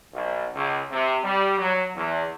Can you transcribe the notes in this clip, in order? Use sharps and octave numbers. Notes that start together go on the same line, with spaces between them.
B1
C#2
C3
G3
F#3
E2